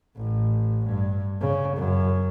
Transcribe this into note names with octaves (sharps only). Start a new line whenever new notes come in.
A1
G2
C#3
F#2